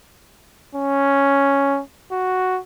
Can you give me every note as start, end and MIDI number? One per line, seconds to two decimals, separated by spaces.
0.75 1.81 61
2.12 2.60 66